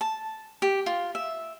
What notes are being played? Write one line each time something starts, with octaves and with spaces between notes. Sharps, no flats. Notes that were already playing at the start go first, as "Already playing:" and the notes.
A5
G4
F4
E5